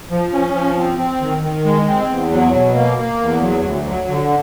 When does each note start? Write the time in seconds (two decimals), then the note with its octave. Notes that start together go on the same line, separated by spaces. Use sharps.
0.10 F3
0.33 C#4
0.55 F3
0.77 C4
0.98 C4
1.21 D#3
1.42 D#3
1.65 G#3
1.88 C4
2.09 E2
2.32 F#3
2.53 B2
2.75 A#3
2.98 A#3
3.21 E2
3.42 F#3
3.64 D2
3.86 F#3
4.08 D3